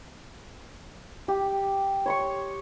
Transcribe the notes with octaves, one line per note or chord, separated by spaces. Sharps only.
G4
C#5 C6 C#6